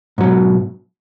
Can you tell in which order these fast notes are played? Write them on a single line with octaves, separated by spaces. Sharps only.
G#2 F#3 B2